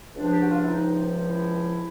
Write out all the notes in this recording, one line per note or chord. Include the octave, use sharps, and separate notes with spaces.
C#2 C3 F3 D4
G4
F#4
F4
E4
D#4
E4